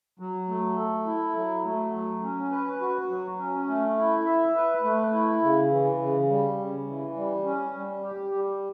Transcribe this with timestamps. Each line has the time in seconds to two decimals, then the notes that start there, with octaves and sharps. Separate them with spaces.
0.19 F#3
0.49 A3
0.77 A4
1.06 E4
1.36 F#3
1.64 A3
1.93 F#3
2.22 C#4
2.51 B4
2.81 F#4
3.09 F#3
3.38 C#4
3.68 A3
3.97 E4
4.26 E5
4.55 B4
4.83 A3
5.13 E4
5.42 C#3
5.71 E3
6.00 C#3
6.29 G3
6.58 C#3
6.87 E3
7.16 G3
7.46 C#4
7.74 G3
8.04 G4
8.32 G3